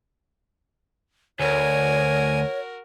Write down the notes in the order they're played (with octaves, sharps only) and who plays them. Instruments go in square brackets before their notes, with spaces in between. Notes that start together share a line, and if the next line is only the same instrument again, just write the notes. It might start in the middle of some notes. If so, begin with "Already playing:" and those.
[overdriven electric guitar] D2 [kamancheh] F#4 A#4 [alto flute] C#5 [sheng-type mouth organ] G#5